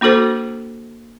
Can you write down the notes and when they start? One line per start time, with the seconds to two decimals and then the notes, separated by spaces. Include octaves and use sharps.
0.01 A#3 D4 F#4 A4 C5